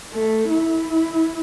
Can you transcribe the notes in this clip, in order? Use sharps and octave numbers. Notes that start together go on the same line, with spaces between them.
A3
E4